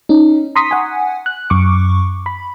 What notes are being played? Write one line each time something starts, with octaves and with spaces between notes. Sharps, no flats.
C#4 D#4
A#5 C6 C#6 D#6 B6
F#5 G#5
F#6
F#2 C#6 D6
B5